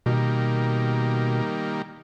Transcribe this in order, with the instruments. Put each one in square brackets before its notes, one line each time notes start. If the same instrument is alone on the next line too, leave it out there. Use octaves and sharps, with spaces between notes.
[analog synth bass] B2 [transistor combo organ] D#3 G3 A#3